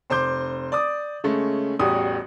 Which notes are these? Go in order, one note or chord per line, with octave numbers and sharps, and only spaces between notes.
F1 C5 C6 D6 G6
D5 D6 D#6
C#3 G#3 A3 C#4
A1 E2 G3 F#4 G4 D#6